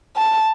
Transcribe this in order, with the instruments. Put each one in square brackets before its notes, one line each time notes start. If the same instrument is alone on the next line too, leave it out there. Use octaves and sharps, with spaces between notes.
[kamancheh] A5